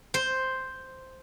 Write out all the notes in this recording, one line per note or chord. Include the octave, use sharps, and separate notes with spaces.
C5